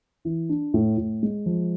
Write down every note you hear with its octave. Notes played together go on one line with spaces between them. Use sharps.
E3
D4
A2
A2
G#3
F3